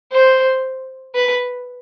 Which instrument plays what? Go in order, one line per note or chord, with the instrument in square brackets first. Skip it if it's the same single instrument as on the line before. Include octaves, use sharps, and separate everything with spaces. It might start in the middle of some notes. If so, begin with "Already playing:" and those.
[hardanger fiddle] C5
B4